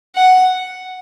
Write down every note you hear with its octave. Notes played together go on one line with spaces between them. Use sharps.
F#5